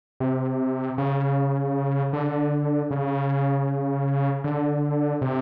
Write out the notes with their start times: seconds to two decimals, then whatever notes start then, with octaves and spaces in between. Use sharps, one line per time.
0.20 C3
0.98 C#3
2.13 D3
2.90 C#3
4.44 D3
5.21 C3